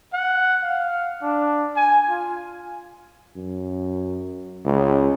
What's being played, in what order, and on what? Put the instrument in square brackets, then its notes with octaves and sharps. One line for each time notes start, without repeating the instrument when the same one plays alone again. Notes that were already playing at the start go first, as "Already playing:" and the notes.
[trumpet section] F#5
F5
D4
G#5
F4
[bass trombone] F#2
C#2